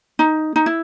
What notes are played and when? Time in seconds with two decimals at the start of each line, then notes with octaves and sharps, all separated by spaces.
0.19 D#4
0.56 D#4
0.66 E4